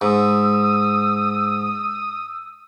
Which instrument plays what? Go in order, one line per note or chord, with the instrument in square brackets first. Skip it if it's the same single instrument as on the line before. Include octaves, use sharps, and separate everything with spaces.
[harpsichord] G#2 [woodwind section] D#6 E6